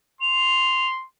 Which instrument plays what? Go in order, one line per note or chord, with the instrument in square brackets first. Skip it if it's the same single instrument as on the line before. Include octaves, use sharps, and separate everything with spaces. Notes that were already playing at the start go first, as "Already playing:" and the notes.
[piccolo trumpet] C6 [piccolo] F7